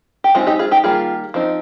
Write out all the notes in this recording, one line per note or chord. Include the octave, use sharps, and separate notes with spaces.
G4
G#3 C4 D#4 F4
D#4 G4
F4 G#4
D#4 G4
D#3 G3 A#3 F4 G#4
F3 C4 D#4